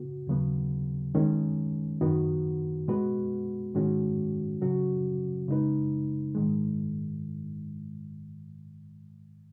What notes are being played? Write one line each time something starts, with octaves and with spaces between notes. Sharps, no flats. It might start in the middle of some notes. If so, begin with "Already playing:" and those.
Already playing: C#3 B3 F#4
D#2 C#3 F#3 B3
D#3 G#3 C#4
F#2 D#3 B3 F#4
B2 G#3 B3 F#4 B4
G#2 D#3 G#3 C#4 F#4
C#3 F#3 C#4 F#4
C#3 G#3 D#4 B4
G#2 D#3 G#3